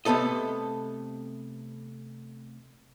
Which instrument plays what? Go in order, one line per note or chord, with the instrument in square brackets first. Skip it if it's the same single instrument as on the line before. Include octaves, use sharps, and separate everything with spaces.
[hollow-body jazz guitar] C3 A3 B3 A4 D#5